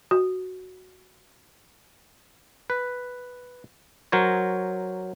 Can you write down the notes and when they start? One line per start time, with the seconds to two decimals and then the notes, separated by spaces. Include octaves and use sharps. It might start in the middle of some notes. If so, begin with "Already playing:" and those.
0.11 F#4
2.70 B4
4.12 F#3 A#4 C5 C#5